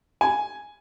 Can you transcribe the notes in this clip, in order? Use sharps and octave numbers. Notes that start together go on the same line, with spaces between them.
G#5